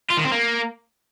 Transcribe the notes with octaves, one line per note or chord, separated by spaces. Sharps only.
F4
D#3
C4
A#3